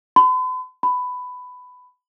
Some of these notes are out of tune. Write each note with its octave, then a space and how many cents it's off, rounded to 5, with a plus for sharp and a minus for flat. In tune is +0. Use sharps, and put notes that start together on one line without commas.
B5 +45
B5 +15